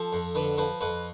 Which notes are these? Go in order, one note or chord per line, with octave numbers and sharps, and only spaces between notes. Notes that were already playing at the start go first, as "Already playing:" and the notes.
Already playing: F3 A4
F2
D3 B4
F3 B4
F2 B4